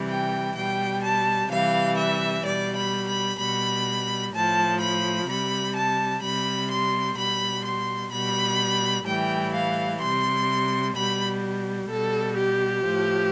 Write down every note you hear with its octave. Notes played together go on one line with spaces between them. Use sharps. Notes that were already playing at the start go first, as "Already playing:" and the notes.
Already playing: C3 E3 G3
G5
B2 G3 G5
A5
C3 E3 G3 F5
E5
B2 G3 D5
B5
B5
B2 G3 B5
A2 F3 A5
B5
C3 G3 B5
A5
C3 G3 B5
C6
B2 G3 B5
C6
B2 G3 B5
A2 E3 G3 G5
F5
C3 G3 C6
B2 G3 B5
B2 G3 A4
G4
A2 F3